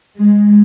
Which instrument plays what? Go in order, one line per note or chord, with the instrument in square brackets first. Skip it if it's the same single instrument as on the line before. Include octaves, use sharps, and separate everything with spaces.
[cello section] G#3